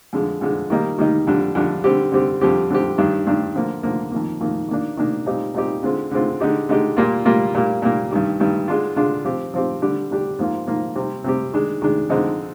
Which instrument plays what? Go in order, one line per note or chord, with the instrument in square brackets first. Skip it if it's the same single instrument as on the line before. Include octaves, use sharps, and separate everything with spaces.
[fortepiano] F2 D3 G#3
F2 D3 G#3
D#3 G3 A#3 D#4
D#3 G3 A#3 D#4
F2 D3 G3 D4
F2 D3 G3 D4
D3 G3 C4 G4
D3 G3 C4 G4
F2 D3 G3 C4 G4
F2 D3 G3 C4 G4
G2 D#3 G3 D4
G2 D#3 G3 D4
D3 F3 A#3
D3 F3 A#3
F2 D#3 A#3
F2 D#3 A#3
D#3 A#3 D4
D#3 A#3 D4
A#2 G3 C4 D#4 G4
A#2 G3 C4 D#4 G4
D3 G#3 C4 F4
D3 G#3 C4 F4
D3 G#3 D#4 G4
D3 G#3 D#4 G4
A#2 G3 A#3 F4
A#2 G3 A#3 F4
A#2 G3 A#3
A#2 G3 A#3
G2 D#3 G3
G2 D#3 G3
D3 G#3 D4 F4
D3 G#3 D4 F4
F3 C4 G4
F3 C4 G4
D3 G3 D4 G4
D3 G3 D4 G4
G#2 F3 A#3 F4
G#2 F3 A#3 F4
C3 G3 C4 G4
C3 G3 C4 G4
D#3 G#3 D4
D#3 G#3 D4
F2 D3 G#3 C4 D#4